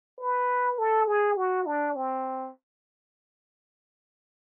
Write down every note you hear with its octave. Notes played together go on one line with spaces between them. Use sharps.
B4
A4
G#4
F#4
D4
C4